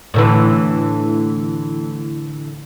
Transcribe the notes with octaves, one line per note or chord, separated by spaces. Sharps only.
A2 D3 E3